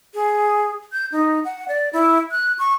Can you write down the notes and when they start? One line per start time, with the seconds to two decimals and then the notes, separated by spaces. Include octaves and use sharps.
0.14 G#4
0.92 G6
1.12 D#4
1.45 F#5
1.68 D5
1.93 E4
2.31 F#6
2.59 C#6